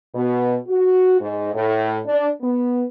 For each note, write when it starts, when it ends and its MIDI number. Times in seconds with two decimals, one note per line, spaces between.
0.13 0.54 47
0.67 1.19 66
1.20 1.51 44
1.53 1.98 45
2.06 2.27 62
2.41 2.83 59